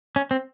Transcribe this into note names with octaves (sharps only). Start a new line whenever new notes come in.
C#4
C4